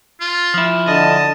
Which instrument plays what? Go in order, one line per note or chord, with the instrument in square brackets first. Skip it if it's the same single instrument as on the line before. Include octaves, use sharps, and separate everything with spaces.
[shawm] F4
[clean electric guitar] F3 E4
[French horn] D3 [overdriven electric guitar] D#5 [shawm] A5